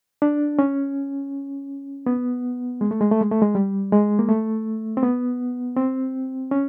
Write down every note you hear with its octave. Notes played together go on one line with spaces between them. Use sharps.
D4
C#4
B3
G#3
A3
G#3
A3
G#3
A3
G#3
G3
G#3
A#3
A3
C4
B3
C4
C#4